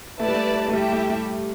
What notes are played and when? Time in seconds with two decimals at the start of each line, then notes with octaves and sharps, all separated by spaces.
0.20 A3 E4 B4 D5 A5
0.28 G3
0.35 A3
0.68 A3
0.73 G3 E4 G4 E5
0.92 A3
1.09 G3